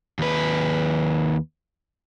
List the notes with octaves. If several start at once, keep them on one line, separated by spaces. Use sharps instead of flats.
D#2 B4